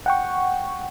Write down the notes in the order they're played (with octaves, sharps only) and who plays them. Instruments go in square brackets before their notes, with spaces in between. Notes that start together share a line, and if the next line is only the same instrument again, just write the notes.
[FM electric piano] F#5 G5 C#6